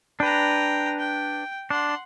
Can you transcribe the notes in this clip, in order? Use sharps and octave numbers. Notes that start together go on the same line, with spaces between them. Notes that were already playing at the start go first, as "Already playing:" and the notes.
D4 B4 G5 A#5
G5
D4 F#5 C6